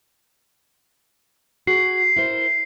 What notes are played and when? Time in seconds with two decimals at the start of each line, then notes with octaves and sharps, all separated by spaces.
1.67 F#4 G#4 C7
2.16 E4 A#4 C5